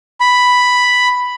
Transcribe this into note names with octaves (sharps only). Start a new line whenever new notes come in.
B5